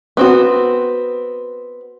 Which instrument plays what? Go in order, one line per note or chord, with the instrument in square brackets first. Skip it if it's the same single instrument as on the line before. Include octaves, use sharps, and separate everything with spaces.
[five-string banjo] B3 C4 F#4